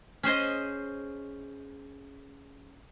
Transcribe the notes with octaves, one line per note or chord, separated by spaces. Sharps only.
C#4 G#4 C5 D#5